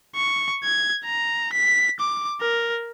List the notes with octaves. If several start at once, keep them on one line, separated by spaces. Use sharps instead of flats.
C#6
G#6
A#5
B6
D6
A#4